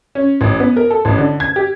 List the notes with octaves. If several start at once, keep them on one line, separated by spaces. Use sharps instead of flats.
C#4
A1
B3
A#4
A4
A1
D3
G#6
G4